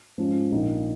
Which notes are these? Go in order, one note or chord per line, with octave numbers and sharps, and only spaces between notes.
G#2 F3 C#4
A#1 A#2 A#3 D#4